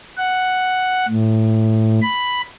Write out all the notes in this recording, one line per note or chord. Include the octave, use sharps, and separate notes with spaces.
F#5
A2
B5